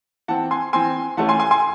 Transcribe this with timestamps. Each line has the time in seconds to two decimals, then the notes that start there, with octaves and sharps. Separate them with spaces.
0.28 E3 C4 F#5 A5
0.51 G#5 C6
0.73 E3 C4 G#5 C6
1.17 E3 A3 C#4 F#5 A5
1.29 G#5 C6
1.40 G#5 C6
1.51 G#5 C6